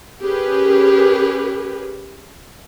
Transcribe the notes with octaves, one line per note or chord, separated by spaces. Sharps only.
C#4 G4 G#4 A#4 B4